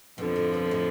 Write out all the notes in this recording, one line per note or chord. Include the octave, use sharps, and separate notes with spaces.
F2 B2 D3 F3
A2
B2
A2